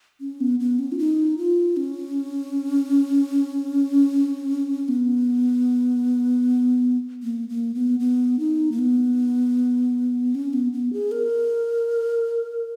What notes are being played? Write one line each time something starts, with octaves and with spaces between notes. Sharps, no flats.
C#4
B3
B3
C#4
F4
D#4
F4
C#4
B3
A#3
A#3
B3
B3
D#4
A#3
B3
C#4
B3
B3
G#4
A#4